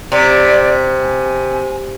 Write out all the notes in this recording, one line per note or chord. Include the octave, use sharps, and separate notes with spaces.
C3 D5
G#5